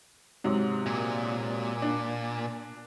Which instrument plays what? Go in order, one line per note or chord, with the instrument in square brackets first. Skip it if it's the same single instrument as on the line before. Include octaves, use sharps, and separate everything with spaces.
[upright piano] G#2 C3 F#3
[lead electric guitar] A#2
[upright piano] D4